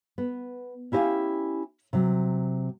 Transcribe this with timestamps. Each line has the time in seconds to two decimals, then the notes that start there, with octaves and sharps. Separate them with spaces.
0.18 B3
0.92 C#4 E4 G4 D#5 F5 G#5
1.93 C3 F#3